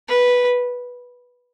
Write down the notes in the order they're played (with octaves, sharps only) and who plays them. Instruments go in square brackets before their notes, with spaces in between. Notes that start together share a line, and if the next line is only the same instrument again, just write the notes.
[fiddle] B4